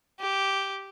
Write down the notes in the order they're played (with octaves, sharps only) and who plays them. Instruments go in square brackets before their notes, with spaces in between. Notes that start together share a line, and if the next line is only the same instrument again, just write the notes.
[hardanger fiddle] G4